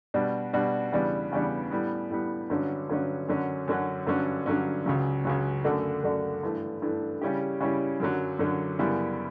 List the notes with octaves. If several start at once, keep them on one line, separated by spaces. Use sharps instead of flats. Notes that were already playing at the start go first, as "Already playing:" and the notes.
B2 G3 D4 F#4
B2 G3 D4 F#4
E2 C#3 G3 B3 D4
E2 C#3 G3 B3 D4
A2 G3 B3
A2 G3 B3
G2 D3 F#3 C#4
G2 D3 F#3 C#4
F#2 D3 F#3 C#4 F#4
F#2 D3 F#3 C#4 F#4
G2 D3 F#3 C#4
G2 D3 F#3 C#4
C#2 C#3 F#3
C#2 C#3 F#3
F#2 D3 A3 D4 F#4
F#2 D3 A3 D4 F#4
G2 E3 A3
G2 E3 A3
C#3 G3 C#4 E4 G4
C#3 G3 C#4 E4 G4
F#2 D3 F#3
F#2 D3 F#3
F#2 C#3 G3 B3 E4